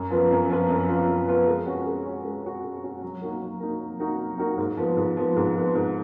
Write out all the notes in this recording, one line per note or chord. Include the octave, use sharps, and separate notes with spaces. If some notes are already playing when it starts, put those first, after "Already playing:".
Already playing: F#2
F3 B3 F4 B4
F#2
F3 B3 F4 B4
F#2
F3 B3 F4 B4
F#2
F3 B3 F4 B4
G#3
C#4 F#4
G#3
C#4 F#4
G#3
C#4 F#4
G#3
C#4 F#4
F#3
A#3 D#4 F#4 A#4
F#3
A#3 D#4 F#4 A#4
F#3
A#3 D#4 F#4 A#4
F#3
A#3 D#4 F#4 A#4
G#2
F3 B3
G#2
F3 B3
G#2
F3 B3
G#2